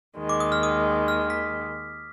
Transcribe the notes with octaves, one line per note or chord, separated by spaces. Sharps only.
D#2 D#3 G#3
D6
D#6
F6
D#6
F6
B6